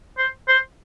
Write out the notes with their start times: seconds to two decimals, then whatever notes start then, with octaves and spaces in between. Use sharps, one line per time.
0.18 C5
0.48 C5